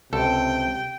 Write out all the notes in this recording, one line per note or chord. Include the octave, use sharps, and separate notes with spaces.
C#2 C3 A4 G5